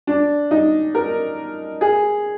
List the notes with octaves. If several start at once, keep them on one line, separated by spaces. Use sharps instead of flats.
D4
D#4
A#4
G#4